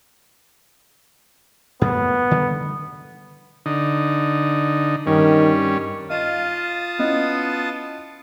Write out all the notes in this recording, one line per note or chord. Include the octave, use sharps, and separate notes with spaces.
F#2 A2 B3
D3 D#3 G3
D3 D#4
G2 D#3 C#4
F4 D#5 F5 A5 D#6
B3 C#4 E4 D#5